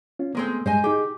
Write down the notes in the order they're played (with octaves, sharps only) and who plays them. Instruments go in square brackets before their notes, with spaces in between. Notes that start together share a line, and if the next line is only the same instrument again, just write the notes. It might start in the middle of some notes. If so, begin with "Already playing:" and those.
[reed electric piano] C#4 F4
[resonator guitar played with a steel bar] D#3 G#3 C4 [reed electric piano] A3 B3
[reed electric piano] G2 G#3 [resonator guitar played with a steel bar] C5 D#5 G#5
[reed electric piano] D#4 G#4 [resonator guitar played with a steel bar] G4